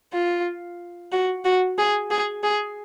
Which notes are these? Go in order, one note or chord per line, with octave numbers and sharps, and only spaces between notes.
F4
F#4
F#4
G#4
G#4
G#4